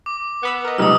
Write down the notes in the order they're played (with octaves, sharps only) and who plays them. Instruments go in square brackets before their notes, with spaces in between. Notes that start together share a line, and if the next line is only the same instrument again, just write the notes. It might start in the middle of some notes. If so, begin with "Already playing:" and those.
[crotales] D6
[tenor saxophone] B3 [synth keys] F#5 B5 E6
[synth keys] A#4 D#5
[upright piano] B1 C3 [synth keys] G3 G#3 [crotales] D#6 E6